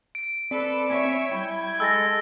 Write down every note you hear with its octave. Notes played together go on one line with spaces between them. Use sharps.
D7
C4 A4 B4 D5 B5
C#5 E5 G#5
G3 E4 G5 G#6
G#3 A4 E6 A6 A#6